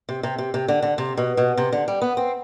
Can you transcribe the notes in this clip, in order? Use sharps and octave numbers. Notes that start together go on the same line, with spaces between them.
C3
C3
C3
C3
D3
D3
C3
B2
B2
C3
D3
G3
B3
C4